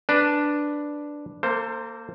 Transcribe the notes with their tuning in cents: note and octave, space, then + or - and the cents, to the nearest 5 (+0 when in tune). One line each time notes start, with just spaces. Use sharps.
D4 +0 B4 +0
A#3 -10 A4 +35 C5 +0